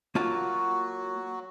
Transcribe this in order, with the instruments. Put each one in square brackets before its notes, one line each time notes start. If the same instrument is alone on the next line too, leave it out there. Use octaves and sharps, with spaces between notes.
[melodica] F#3 F#4 [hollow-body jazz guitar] A#3 F4 A5